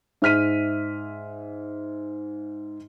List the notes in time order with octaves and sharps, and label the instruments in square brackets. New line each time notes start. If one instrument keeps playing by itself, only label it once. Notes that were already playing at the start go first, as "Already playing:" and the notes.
[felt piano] G#2 E5 F6 B6 D#7